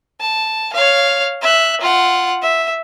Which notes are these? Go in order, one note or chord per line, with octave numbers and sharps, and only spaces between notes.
A5
C#5 F5
E5 F#6
F4 F#5
E5